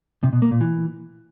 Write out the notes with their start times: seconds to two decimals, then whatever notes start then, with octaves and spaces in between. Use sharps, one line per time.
0.23 C3
0.33 B2
0.42 A#3
0.51 A#2
0.61 E3